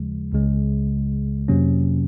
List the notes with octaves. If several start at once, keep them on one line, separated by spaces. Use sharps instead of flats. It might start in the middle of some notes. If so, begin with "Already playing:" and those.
Already playing: D#2 C#3 F3 G#3
C#2 C#3 G#3
F2 C3 F#3 A#3 C#4